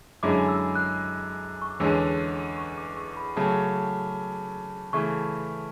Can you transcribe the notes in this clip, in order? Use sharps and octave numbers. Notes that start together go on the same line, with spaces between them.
F#2 D3 G#3 C#4 E4 D6
E6
F#6
C#6
D6
E2 D3 G#3 C#4 E6
C#6
D6
C#6
B5
C#3 F#3 A3 A5
C#3 E3 A3 C#6